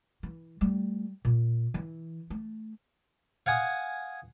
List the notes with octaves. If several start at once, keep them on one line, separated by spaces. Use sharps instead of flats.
E3
G3 A3
A#2
E3
A3
F5 F#5 G#5 D#6